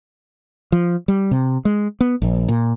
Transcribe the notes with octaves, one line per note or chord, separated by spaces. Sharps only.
F3
G3
C3
G#3
B3
A#1
A#2